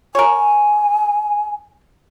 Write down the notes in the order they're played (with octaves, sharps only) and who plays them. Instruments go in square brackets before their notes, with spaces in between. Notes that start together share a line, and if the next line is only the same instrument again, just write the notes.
[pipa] A#4 C#5 [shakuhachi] G#5